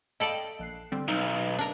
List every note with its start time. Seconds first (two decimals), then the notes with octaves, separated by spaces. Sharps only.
0.20 E4 A4 D5 D#5 F5 G5
0.59 A#1 F#6 C7
0.92 D3 G3 C4
1.08 B1 D#4
1.58 D4 A#4